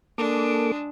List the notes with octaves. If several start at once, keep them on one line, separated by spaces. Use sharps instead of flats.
G#3 A#3 D4 A4 D6